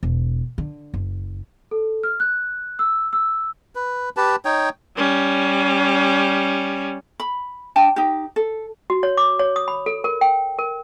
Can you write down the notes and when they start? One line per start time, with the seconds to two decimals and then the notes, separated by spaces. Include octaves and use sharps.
0.03 E1
0.58 D3
0.94 F#1
1.71 A4
2.03 F6
2.20 F#6
2.79 E6
3.13 E6
3.75 B4
4.17 G4 B4 A5
4.45 D#4 C#5 G5
4.97 G3 C#4
7.20 B5
7.76 D4 G5 A5
7.96 D#4 G4
8.36 A4
8.90 F#4
9.03 C#5
9.17 D6
9.39 C#5
9.56 D#6
9.68 B5
9.86 A4
10.04 A#4
10.21 G5
10.59 A#4